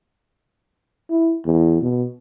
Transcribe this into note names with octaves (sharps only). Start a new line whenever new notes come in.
E4
E2
B2